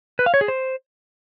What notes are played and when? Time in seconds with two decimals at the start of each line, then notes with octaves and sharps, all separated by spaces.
0.19 B4
0.26 F5
0.34 C#5
0.41 G#4
0.48 C5